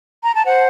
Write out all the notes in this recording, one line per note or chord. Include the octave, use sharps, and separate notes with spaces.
A#5
A5
C5 F#5